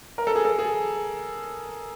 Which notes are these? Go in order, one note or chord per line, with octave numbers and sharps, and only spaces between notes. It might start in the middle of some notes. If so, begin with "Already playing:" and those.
A#4
A4
G#4
A4
G#4